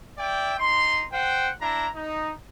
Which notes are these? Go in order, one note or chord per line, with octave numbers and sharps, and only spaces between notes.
D5 E5 G5
D#4 C6
C5 F#5 G5
D4 E4 A#5
D#4